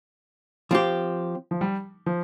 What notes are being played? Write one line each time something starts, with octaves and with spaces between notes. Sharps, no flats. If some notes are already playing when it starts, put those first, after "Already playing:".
F3 C4 G4
F3
G3
F3